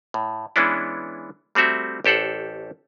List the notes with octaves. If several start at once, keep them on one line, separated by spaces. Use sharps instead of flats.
A2
E3 G#3 B3 C#4 D4 E4
G3 A3 C4 F#4 E5
A1 G4 A4 C5 F#5